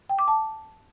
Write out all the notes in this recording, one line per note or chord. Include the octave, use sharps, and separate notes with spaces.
G5
D6
A5